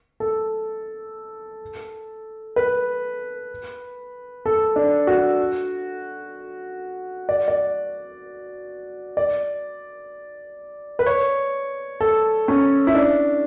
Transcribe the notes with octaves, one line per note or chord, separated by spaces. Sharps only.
A4
B4
A4
D4
F#4
D5
D5
D5
B4
C#5
A4
C#4
E4
D4